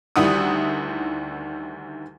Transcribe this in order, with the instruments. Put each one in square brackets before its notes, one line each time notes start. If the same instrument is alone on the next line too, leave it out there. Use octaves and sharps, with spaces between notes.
[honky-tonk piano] D2 D#3 G3 E4 F#5 D#6